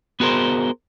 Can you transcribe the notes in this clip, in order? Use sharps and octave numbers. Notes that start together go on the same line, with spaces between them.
B3 F#4 G#4 A#4 C5